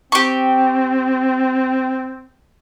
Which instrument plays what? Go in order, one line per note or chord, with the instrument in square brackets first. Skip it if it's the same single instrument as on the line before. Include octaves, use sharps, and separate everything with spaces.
[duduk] C4 [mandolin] G4 C#6